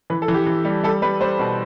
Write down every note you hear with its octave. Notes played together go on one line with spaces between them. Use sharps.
E3 B4
A4
E3
G4
E3
G3
G3 A4
G3 B4
G3 C5
B2